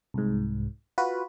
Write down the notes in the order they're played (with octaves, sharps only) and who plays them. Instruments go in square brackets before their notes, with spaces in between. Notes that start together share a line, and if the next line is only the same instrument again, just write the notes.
[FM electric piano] C2 G#2
F4 F#4 B4